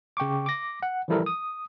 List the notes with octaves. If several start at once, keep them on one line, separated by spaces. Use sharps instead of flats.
C#3 G5 C#6 D6
D6 A#6
F#5
E3 F3 G3 E4 A4 A#4
D#6